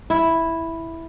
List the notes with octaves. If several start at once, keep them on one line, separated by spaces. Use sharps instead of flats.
E4